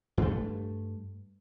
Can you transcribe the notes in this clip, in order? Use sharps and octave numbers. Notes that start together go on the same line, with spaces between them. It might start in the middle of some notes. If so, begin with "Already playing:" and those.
G2 A3